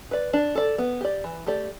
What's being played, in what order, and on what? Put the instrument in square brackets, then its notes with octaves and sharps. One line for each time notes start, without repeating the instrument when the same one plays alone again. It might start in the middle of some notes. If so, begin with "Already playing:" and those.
[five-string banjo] B4 D5
D4
A4 D5
B3
G4 D5
E3
A3 G4 D5